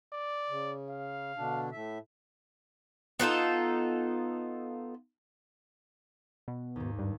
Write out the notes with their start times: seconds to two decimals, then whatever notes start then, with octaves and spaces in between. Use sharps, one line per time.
0.13 D5
0.49 C#3
0.89 F5
1.37 B2 D3 D4
1.72 A2 E5
3.20 B3 D#4 F4 A4
6.48 B2
6.76 D#2 G#2
6.99 G2